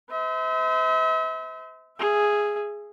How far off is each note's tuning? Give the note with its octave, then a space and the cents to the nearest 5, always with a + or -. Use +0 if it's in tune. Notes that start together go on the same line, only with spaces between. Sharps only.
C5 -40 E5 -40
G#4 +0 E5 +30